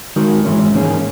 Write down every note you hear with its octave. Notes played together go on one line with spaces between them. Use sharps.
D#3 G#3 D#4 F#4 A#4
G#2 E3 G#3 C#4
G#2 D#3 A#3 C#4 G#4